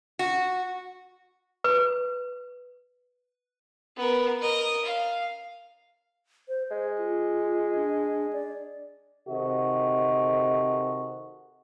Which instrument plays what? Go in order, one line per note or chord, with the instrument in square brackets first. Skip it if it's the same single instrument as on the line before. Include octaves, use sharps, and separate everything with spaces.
[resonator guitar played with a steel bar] F#4
[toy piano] B4
[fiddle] B3 A#4
A#4 D#5
F5
[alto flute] C5
[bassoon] G#3 [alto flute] C5
[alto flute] F4
D4
D5
[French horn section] C3 D#3 F#4 A4 C5 D#5